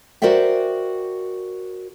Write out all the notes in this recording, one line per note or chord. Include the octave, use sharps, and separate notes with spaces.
F#4 A#4 C5 D5 E5 G5